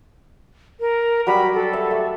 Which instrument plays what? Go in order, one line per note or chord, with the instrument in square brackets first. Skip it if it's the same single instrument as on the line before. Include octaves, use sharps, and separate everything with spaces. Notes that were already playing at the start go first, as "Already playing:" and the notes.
[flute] A#4
[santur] F#3 G3 F#5 [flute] B5
[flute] A4
[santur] E5
A3